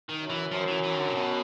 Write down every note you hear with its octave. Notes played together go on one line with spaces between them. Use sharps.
D#3
F#2
E3
F#2 F3
E3
E3
D#3
D3
C3
B2